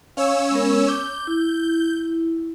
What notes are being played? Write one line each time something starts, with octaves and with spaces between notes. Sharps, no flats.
C#4 C#5 F5 E6
G#3 B3 A#4
D6 G6
E4